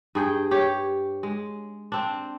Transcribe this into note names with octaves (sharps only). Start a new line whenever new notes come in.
G2 G#4 G5
G4 C#5
G#3
C4 D4